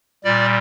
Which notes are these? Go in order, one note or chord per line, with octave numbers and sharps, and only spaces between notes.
A#2 G3 D5